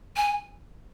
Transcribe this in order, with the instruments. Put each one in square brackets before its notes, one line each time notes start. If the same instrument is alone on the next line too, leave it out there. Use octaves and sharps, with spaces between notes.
[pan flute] G#5